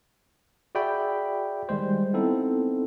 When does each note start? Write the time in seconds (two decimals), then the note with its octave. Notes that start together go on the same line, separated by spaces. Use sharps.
0.75 F#4 G#4 D5 E5 G5 B5
1.69 D#3 G3 G#3 C5
2.13 B3 C4 D#4 E4 A4